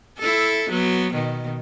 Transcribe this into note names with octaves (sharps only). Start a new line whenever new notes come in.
E4 A4
F#3 B3
B2 D#3